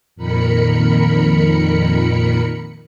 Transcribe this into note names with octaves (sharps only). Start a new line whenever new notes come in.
F2 A#2 D#3 A#4 B5 C#7